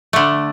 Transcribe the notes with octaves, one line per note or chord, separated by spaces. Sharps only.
D3 A3